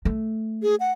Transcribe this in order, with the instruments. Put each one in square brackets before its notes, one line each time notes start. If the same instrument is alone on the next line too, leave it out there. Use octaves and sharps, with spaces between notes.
[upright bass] A3
[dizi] G#4
F#5